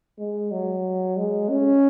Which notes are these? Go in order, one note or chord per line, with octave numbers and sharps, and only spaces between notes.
G#3
F#3
G#3
C#4